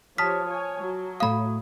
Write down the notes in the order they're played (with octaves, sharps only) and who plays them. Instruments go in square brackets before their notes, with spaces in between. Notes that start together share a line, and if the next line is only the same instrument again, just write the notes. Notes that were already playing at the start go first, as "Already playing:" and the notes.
[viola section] F3 G4 C#5 [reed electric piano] A5 D#6 F6 [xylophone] B6
[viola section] C#5 G#5
F#3
[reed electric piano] A2 A3 D#6 [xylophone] F5 B5